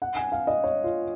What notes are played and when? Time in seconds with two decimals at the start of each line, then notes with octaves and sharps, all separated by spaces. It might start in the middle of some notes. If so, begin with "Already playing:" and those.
0.02 F#5
0.16 G#5
0.32 F5
0.47 D#5
0.64 C#5
0.84 F4